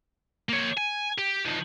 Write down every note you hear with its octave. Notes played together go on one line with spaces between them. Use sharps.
A#3 C#5
G#5
G4
D#3 F3